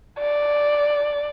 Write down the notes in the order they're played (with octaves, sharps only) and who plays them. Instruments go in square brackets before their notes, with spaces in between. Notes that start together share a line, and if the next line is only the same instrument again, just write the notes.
[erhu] D5